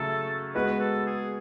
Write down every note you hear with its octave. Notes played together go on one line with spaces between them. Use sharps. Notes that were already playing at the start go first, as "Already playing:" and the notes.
Already playing: C#3 F#3 A3 C#4 A4
G#3 B3 F#4 B4
A4
G#4